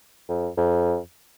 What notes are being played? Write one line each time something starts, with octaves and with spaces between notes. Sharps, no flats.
F2
F2